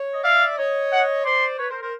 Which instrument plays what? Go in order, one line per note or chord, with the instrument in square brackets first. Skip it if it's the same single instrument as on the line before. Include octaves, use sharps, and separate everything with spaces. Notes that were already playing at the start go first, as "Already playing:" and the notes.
Already playing: [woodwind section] C#5
D#5
[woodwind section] D5 E5 [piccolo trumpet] F5
[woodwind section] C#5 D#5
[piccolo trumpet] F#5
[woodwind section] C5 D5 [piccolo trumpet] C6
[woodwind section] B4 C#5
A#4 C5
A#4 C5